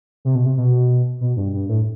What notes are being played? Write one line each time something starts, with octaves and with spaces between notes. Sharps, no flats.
C3
B2
C3
B2
B2
G2
G2
A2